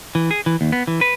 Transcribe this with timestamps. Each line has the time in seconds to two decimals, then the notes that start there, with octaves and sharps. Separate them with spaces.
0.15 E3
0.31 G#4
0.46 E3
0.61 D#2
0.72 B3
0.87 E3
1.01 B4